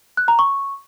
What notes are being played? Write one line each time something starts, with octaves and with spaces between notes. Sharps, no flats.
F#6
A#5
C#6